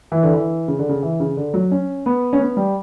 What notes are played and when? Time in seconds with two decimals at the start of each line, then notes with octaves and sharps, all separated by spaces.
0.12 E3
0.23 D3
0.34 E3
0.68 C#3
0.79 D3
0.89 C#3
1.03 E3
1.20 C#3
1.37 D3
1.54 F#3
1.71 C#4
2.06 B3
2.33 C#4
2.40 B3
2.57 G3